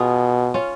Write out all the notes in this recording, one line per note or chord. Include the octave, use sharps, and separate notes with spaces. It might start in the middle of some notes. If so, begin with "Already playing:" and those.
Already playing: B2 F4 G#4
C#4 F4